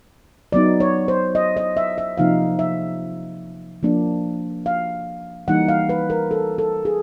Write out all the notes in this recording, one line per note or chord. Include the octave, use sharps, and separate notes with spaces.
F#3 B3 D#4 D5
C#5
C5
D#5
D#5
E5
E5
C3 F3 A#3 D#4 F5
E5
F3 A#3 D4
F5
E3 G3 A#3 D#4 F#5
F5
B4
A#4
A4
A4
G#4